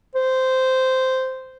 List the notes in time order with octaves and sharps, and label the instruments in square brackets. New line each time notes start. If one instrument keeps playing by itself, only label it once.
[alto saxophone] C5